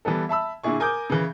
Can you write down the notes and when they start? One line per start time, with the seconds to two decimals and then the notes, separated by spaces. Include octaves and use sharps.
0.05 E3 G3 B3 A4
0.29 E5 A5 B5 E6
0.64 A#2 D3 E4 G#4 C#6
0.80 A#4 G#5 D6 D#6 G6
1.10 C#3 E3